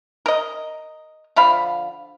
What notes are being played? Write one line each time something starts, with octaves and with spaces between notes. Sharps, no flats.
A#4 D#5
D3 F3 F5 B5